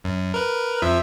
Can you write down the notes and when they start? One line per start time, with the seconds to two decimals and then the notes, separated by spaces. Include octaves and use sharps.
0.04 F#2
0.34 A#4 B4
0.82 F2 F3 E5